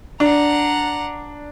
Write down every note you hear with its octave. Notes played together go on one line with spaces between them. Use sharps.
D4 F#5 A#5